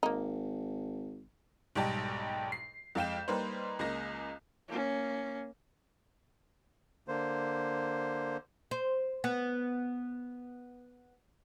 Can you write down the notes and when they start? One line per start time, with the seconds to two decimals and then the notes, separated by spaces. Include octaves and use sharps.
0.03 G#1 A#3 D#4
1.75 B1 G#2 G3 G4 A5
2.52 C7
2.95 F2 G#3 F5 G5 G6 E7
3.28 G3 A#3 D#4 B4 C5
3.79 C#2 G#3 A#3 A#6
4.68 A#3 C#4
7.08 D3 A#3 C5
8.71 C5
9.24 B3